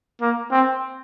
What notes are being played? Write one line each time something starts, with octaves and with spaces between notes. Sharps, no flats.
A#3
C4